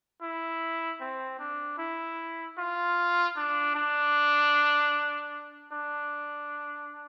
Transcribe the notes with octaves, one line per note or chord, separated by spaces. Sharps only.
E4
C4
D4
E4
F4
D4
D4
D4